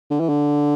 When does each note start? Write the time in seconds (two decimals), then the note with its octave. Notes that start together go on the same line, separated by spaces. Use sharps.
0.10 D3
0.20 E3
0.29 D3